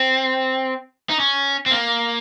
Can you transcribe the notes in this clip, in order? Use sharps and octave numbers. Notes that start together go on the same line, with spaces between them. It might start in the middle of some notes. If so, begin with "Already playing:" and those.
Already playing: C4
D#4
C#4
C4
A#3